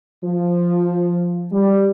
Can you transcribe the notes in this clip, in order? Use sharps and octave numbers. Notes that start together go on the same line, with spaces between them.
F3
G3